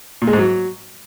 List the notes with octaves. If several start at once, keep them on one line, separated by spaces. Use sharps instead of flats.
A#2
G#3
G#2
F#3